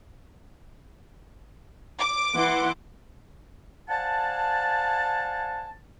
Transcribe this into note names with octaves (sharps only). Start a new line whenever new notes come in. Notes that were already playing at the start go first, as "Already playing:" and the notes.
D6
E3 F#5 C6
C5 D5 F5 F#5 G#5 A5